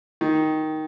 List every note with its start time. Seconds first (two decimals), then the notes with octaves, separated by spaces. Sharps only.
0.21 D#3